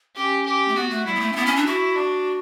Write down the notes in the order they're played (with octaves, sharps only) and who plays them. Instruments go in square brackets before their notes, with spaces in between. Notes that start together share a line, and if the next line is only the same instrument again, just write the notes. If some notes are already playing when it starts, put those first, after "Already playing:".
[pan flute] C#4 [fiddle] G4
[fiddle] G4
[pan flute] A3
[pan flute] B3 [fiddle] F#4
[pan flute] A3
[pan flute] G3 [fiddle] E4
[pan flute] B3
A3
C#4
[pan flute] B3 [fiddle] E4
[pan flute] C#4
D4
[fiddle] E4 [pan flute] F#4
[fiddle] D4